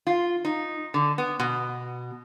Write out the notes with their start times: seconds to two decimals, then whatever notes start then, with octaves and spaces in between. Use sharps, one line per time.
0.07 F4
0.45 D#4
0.94 D3
1.18 B3
1.40 B2